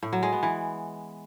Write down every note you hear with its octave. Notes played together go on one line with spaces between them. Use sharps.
A2
F#3
G#3
B3
E3